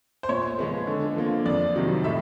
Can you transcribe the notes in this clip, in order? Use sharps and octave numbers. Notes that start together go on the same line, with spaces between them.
C5
A#2 C#5
F3 G#3 B3
D3
F3 A#3
F2 D5
C3 D#3 F#3
A2 E5